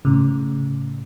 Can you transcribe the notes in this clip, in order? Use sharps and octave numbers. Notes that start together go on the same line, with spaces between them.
A2 C#3